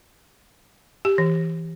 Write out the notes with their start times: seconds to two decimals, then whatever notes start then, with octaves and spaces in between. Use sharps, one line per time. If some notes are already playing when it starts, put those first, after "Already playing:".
1.05 G4
1.18 E3